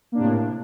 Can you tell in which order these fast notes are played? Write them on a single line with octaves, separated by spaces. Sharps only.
A#3 D4 C3 A2